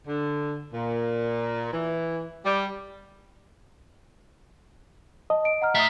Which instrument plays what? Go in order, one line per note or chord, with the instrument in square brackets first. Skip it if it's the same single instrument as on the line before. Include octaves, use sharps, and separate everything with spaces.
[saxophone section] D3
A#2
E3
G3
[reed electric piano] D#5 [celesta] A5
[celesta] D7
F#5 A#5 F6
[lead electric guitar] A2 E5 [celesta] A#5 D#6